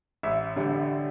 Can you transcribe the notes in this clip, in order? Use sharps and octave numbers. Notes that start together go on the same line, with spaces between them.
A1 E5
D3 G3